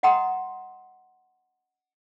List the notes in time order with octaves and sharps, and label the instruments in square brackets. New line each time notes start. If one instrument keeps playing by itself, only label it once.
[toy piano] D#5 F#5 G5 A#5 C6 D#6